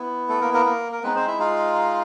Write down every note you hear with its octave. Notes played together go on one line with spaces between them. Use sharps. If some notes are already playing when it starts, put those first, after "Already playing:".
Already playing: B3 E4
A3 A4
A#3 A#4
A#3 A#4
A#3 A#4
A#4
G#3 B3 C4 D#4 B4
C4 C5
E4 E5
F4 F5